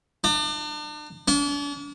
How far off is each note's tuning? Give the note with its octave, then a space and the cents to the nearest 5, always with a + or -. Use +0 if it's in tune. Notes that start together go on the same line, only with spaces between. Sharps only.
D4 +40
D4 -45